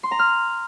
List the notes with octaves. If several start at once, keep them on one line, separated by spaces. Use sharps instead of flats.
C6
A#5
F6